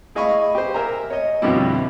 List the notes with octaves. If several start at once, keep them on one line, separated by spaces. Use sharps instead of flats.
E4 G#4 D#5 F5 B5 C#6
G4 C5
A#4 E5 G#5 A#5
C#5 D#5
F2 B2 D3 G3 E4